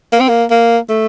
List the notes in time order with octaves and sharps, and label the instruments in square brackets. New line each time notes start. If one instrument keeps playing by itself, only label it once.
[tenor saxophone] A#3
C4
A#3
A#3
A3